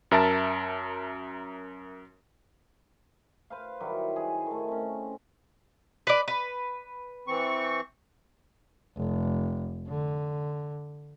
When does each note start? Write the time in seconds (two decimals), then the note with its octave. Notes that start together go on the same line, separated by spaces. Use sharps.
0.11 F#2 A#4 E5 A5 A6
3.50 B4 C5 F5
3.80 D#3 F#3 G3 E4
4.16 G#4
4.46 D#3 A3
4.68 C4 C#4
6.07 B4 D5
6.28 B4
7.28 E3 C4 C#6
8.97 F1
9.88 D3